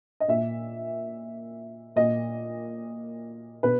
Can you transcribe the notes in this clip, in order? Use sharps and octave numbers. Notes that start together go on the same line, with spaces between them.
D#5
A#2 E5
A#2 D#5
B2 B4